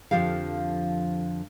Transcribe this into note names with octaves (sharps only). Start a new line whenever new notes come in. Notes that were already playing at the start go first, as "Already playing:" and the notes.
F2 D3 F3 F4 G4 F5